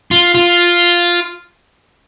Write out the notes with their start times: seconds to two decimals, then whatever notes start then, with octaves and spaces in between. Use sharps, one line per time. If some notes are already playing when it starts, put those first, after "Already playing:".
0.11 F4
0.35 F4